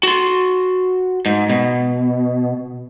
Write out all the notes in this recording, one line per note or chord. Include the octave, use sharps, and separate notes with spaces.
F#4 C6
G#2
B2